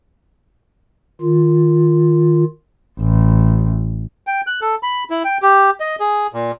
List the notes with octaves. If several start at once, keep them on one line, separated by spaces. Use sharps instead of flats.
D#3 F4
A1
G5
F#6
A4
B5
E4
G5
G4
D#5
G#4
A#2